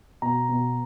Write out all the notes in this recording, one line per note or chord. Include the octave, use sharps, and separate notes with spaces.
B2 A#5
B2